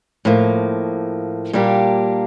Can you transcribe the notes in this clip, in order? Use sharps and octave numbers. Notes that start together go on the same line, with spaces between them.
A2 F3 A#3
A#2 G3 A#3 D4 G4